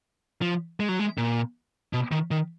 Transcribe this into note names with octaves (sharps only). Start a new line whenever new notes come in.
F3
G#3
F#3
G#3
A#2
B2
D#3
D#3